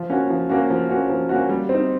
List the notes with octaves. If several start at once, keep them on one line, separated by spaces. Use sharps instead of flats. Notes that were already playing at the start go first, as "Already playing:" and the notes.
Already playing: F3
A#3 C#4 F#4
F3
A#3 C#4 F#4
F3
A#3 C#4 F#4
F3
A#3 C#4 F#4
G3
C4 D#4